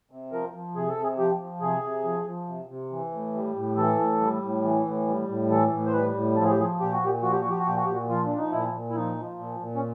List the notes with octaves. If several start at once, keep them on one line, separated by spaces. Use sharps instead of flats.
C3
F3 A#4
F3
C3 G#4
A4
C3
G#4
F3 G4
F3
C3 G#4
C3
F3
F3
C3
C3
E3
A2
G3
A2
E3 A4
A2
G3
A2
E3
A2
G3
A2
E3 A4
A2
C5
G3 B4
A2
F3 A4
G#4
G4
F3 G#4
A#2 G4
F#4
A#2 G4
F3 F#4
G4
F#4
F3 G4
F#4
A#2 G4
F#4
A#2 G4
F#4
F3 F4
F3 D4
D#4
A#2 E4
A#2
E4
F3 D#4
F3
A#2
A#2
C#4